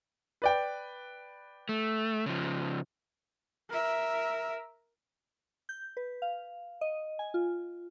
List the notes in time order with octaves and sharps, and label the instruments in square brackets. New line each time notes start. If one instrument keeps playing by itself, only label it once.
[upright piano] B4 D5 G5
[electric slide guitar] A3
C#3 F3
[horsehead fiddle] A#4 E5
[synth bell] G6
B4
F5
D#5
G#5
F4